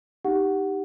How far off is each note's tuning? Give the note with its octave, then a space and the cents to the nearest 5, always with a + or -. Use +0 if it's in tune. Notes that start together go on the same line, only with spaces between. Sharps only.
D#4 +0 G4 +0 F#5 +0